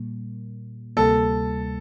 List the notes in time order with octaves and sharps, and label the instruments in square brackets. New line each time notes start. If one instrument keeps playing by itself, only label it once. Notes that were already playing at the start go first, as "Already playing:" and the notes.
Already playing: [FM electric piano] A#2 G3 A#3
[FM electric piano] D2 C3 G3 A#3 [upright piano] A4